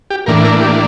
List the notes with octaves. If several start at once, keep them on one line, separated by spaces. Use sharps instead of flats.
G4
A2 E3 A#3 D4 A#4
A#4
G4